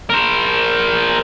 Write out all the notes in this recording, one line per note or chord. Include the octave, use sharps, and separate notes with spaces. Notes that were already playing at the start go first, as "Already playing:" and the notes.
A#4 C5